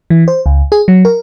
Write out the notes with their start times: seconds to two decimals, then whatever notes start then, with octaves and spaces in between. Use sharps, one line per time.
0.10 E3
0.28 C5
0.46 C#2
0.72 G#4
0.88 F#3
1.05 A#4